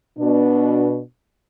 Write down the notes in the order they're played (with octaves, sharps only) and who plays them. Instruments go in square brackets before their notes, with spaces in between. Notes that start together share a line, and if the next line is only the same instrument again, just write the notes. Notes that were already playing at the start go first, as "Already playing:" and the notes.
[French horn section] B2 D4